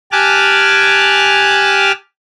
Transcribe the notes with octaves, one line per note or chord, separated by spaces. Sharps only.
G4 G#5 A5 D6 F6 F#6